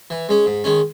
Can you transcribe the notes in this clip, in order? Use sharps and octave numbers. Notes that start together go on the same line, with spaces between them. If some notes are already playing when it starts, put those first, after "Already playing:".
E3
G#3 C#4
G#2
D#3 G#3 C#4